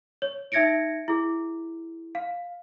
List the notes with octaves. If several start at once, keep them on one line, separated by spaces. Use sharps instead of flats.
C#5
D#4 E5 G#6 A#6 C#7 D7
E4 G#4
F5